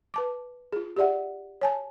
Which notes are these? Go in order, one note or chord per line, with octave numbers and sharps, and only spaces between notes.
B4 A5 D6
F4 G#4
G4 G#4 D5 E5 F#5
C#5 G#5 A5